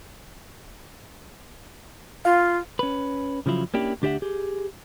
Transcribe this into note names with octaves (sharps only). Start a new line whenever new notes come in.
F4 F5
C#4 B4
C#3 F3 F#3 E4 F4
A#3 C#4 D4 E4 G4
D2 D4 G4 C#5 E5 F#5
G4 G#4